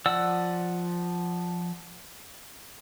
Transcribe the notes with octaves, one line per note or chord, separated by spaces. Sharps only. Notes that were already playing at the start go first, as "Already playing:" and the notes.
F3 D5 F#5 E6